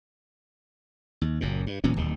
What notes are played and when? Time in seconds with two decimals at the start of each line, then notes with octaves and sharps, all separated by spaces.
1.21 D#2
1.41 F#1 F#2 A#2
1.66 G2
1.84 D1 A#2 E3 C#4
1.96 D1 D#2 D#3